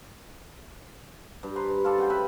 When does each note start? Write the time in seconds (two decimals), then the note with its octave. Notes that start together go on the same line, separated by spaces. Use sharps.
1.43 G2
1.56 B4 C5 A#5
1.69 G2
1.84 F4 A4 D5
1.98 C#3 F#4 G5
2.10 B4 E5 B5